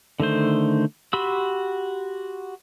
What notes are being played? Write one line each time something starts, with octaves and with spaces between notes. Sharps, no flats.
D3 D#3 A3 C5
F#4 G4 B5 C6 E6